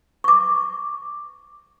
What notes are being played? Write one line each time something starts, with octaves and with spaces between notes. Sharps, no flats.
C#6 D6